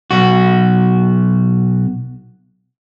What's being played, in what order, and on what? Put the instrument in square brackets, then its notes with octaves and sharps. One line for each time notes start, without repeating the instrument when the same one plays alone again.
[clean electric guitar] B1 F#4